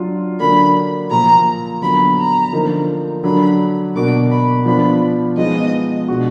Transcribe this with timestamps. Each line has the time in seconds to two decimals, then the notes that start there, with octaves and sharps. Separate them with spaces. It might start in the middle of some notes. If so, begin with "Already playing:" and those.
Already playing: F#3 D4 F4
0.40 D3 F#3 A#3 D4 B5
1.10 A#2 F3 A#3 F4 A#5
1.81 D3 F#3 B3 B5
2.17 A#5
2.53 D3 F3 A#3 D#4
3.23 D3 F#3 D4 B5
3.95 B2 A#3 D4 F#4 D6
4.30 B5
4.65 F3 B3 D4 F4 B5
5.37 F3 G#3 B3 D#4 D#5
6.08 B2 G#3 D4 F#4